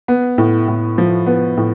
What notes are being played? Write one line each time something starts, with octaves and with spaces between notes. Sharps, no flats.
B3
A2
A2
F3
B3
A2